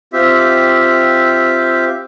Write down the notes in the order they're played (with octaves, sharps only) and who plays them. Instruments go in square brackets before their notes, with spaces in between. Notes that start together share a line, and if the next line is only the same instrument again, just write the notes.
[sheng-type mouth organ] C4 F4 G4 E5